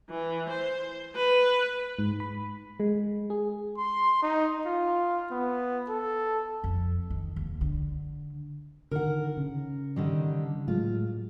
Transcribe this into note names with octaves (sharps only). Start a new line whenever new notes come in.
E3
C5
B4
G#2
B5
G#3
G#4
C6
D#4
F4
B3
A4
F2
D#3
D#2
D3
D3 D#3 A#4 F#5
C#3
D3 D#3 G3
A2 F#3 G#3 F4